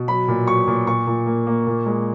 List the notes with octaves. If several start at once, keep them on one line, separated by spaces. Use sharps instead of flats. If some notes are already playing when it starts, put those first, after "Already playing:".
Already playing: B2
F#3 B5
A#2
F#3 C#6
A#2
A#2 C#6
A#2
A#3
A#3
A#2
G#3